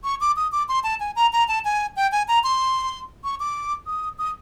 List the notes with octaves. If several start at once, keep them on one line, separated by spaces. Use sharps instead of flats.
C#6
D6
D#6
D6
C6
A5
G#5
A#5
A#5
A5
G#5
G5
G#5
A#5
C6
C#6
D6
D#6
D#6